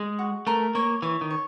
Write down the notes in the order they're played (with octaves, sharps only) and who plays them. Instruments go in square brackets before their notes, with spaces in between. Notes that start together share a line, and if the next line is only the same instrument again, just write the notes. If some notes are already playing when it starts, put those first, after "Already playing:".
Already playing: [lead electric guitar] G#3
[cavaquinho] F#4
[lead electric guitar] A3 [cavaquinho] A#4
[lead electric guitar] A#3 [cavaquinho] C#5
[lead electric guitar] E3 [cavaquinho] C#5
[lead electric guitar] D#3
[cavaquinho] C#5